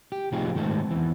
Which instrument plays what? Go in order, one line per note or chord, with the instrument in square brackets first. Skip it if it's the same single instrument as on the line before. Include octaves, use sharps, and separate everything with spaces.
[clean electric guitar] G4
A2 C3 F3 D#4 F4 G#4
G#2 D#3 A3 C4 A5
E2 E3